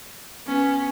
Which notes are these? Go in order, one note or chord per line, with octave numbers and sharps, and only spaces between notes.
B3 C#4